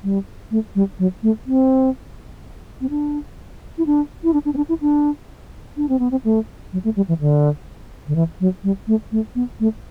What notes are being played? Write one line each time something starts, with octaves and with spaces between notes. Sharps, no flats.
G3
A3
G3
F#3
A3
C4
C4
D4
E4
D4
E4
D4
D4
C4
D4
E4
D4
D4
C4
B3
C4
A3
F#3
A3
G3
E3
D3
D3
E3
F#3
G3
A3
A3
B3
A3